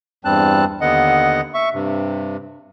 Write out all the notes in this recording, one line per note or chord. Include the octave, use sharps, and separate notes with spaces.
E2 G2 G3 C4 A5 F#6
D#2 D3 B3 D#5 F#5
E5 C#6
G2 C3